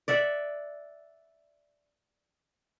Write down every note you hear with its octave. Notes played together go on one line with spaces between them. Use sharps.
D5 E5 F#5